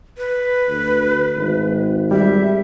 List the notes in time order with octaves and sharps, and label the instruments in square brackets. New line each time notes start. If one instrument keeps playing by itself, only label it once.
[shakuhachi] B4
[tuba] D2
G#1
[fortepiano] G3 [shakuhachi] E5